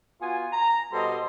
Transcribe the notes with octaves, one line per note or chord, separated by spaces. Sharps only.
B3 F4 F#4 G#5
A#5
B2 G3 A4 C5 D#5 C6